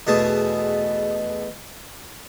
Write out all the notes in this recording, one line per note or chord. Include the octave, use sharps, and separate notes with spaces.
E2 B2 A3 G#4 A5